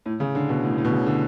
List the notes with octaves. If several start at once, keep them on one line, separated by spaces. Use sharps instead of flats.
A2
C#3
D3
B2
A2
A2
B2
C#3
D3